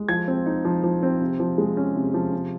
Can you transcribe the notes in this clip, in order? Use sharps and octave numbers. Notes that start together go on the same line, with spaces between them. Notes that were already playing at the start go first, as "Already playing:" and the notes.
Already playing: G#3
F3 G#6
C4
D#4
F3
F3
C4
C3
F3
G#3
C#4
C3
F3
C3